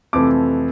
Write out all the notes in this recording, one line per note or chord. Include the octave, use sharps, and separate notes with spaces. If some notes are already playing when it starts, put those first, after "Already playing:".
F2 C3 E3 A3 D6